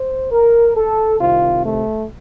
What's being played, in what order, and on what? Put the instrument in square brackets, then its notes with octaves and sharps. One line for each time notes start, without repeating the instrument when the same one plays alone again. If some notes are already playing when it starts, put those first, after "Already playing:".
Already playing: [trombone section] C5
A#4
A4
C2 C3 D#3 F4
A3